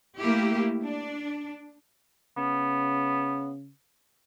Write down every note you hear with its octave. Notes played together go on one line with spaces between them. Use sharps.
A3 A#3 E4 G4
D4
C#3 B3